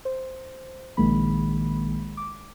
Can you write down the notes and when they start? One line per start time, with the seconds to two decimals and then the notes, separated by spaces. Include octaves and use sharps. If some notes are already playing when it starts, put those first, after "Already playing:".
0.05 C5
0.97 A#1 D#3 G#3 A#3 B5
2.17 D6